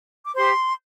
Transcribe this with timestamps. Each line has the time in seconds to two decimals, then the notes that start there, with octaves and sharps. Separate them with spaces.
0.24 D6
0.34 G4 C5 C6